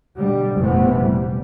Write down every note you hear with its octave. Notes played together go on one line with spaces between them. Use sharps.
B2 D3 G3
F1 A#1 C3 E3 A3 B3
G3